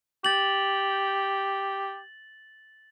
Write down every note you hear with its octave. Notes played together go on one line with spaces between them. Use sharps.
G4 A6 F#7